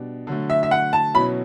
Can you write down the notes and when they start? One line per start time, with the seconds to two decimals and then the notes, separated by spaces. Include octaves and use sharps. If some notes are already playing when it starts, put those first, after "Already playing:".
Already playing: B2 G3 D4
0.27 D3 F#3 A3
0.50 E5
0.63 E5
0.71 F#5
0.93 A5
1.14 B2 F#3 C#4 E4 B5